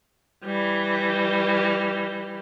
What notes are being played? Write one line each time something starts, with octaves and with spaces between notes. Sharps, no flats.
E3 G3